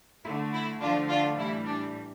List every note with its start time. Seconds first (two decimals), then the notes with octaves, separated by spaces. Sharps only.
0.24 A3 E4
0.29 D3
0.53 E4
0.81 D3 F3 A3 D4 F4
1.09 D4 F4
1.38 A2 E3 G3 E4
1.66 D4